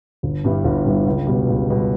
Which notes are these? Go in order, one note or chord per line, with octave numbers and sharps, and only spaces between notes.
G1
G2 G3 B3 E4
G1
G2 G3 B3 E4
C#2
B2 G3 B3
C#2
B2 G3 B3